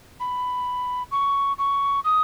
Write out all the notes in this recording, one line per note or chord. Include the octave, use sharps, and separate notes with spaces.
B5
C#6
C#6
D#6